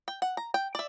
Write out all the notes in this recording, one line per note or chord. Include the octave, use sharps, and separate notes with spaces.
G5
F#5
A#5
G5
D5 E5